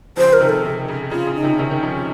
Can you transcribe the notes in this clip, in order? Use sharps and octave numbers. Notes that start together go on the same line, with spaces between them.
C#3 F3 C5
A#4
C3 D#3
A4
C3
C#3
C#3 F4
C#3
D#4
C3 D#3
C3 D#3 C#4
D#3
C#3 F3